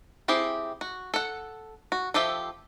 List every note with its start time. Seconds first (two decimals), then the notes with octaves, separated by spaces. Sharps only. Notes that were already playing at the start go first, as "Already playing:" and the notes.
0.28 C4 E4 G4 G#4
0.81 F#4
1.14 A4 F#5
1.92 F#4
2.14 F3 G4 A4 E5